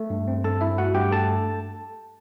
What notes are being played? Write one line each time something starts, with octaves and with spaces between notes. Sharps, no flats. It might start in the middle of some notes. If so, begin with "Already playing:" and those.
Already playing: A3
G2
C4
G2 A4 A5
G2 E4 E5
A3 F#4 F#5
G2 G4 G5
A3 A4 A5